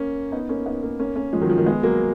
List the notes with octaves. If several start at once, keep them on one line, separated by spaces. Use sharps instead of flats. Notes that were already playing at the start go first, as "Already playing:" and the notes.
Already playing: A#3 C#4
B3 D#4
A#3 C#4
B3 D#4
A#3 C#4
A#3 C#4
A#3 C#4
F3 G#3
D#3 F#3
F3
D#3
G#3 B3
F#3 A#3